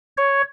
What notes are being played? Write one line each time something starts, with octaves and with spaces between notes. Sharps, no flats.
C#5